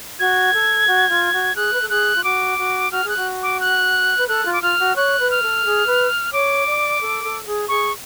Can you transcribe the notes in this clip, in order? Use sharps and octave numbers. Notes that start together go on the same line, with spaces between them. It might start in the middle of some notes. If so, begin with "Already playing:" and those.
F#4 G#6
A4
F#4
F4
F#4
G#4 F#6
B4
A4
G#4 F#6
F4
F#4 D6
F#4
F#4 F6
G#4 F#6
F#4
D6
F#6
B4
A4 F#6
F4
D6
F4 F6
F#4
C#5 F#6
B4
F6
A4
G#4
B4
C#5 D6
D5
A4
A4
G#4
G#4 C#6